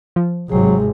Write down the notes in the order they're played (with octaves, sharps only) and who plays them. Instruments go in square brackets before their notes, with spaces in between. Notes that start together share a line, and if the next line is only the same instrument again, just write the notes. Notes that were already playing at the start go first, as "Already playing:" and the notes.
[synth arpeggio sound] F3
[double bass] G#1 C3 [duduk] F#3 [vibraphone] G#3 G#4